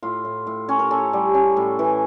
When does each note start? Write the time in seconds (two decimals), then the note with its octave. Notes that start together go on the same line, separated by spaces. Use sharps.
0.03 A2 F4
0.25 A2
0.47 A2
0.69 C#4 C#5
0.79 A#4
0.91 C#4 A4
1.13 G3
1.34 C#4
1.57 A2
1.79 E3